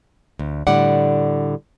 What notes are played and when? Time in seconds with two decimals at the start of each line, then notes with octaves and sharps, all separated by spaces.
0.39 D2
0.67 A2 D3 G3 D5 F#5